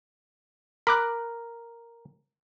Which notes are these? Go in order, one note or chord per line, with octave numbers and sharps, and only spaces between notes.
A#4 B5 D6 F#6